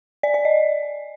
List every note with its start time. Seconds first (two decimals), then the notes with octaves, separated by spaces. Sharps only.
0.23 D5
0.34 D5
0.45 D#5